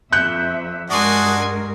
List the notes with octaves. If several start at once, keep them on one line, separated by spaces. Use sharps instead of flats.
F2 E5 F#6 G6 C#7
G2 G#3 D4 F#4 A#4 G#5 C6 D#6